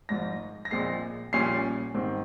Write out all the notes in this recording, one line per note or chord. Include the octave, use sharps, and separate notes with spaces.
G#1 G#2 F3 A#6
A#6
A#1 A#2 G#3 C4 C7
A#1 A#2 G3 C#4 C7
G#2 D#3 G3 C4